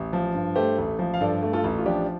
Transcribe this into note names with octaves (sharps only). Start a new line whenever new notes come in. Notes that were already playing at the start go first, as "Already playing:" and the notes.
Already playing: A1
F3
G2
A3 G4 C5
A1
F3
F5
G2 A4 D5
A3
F4 A4
A1
F4
F3 D4 G4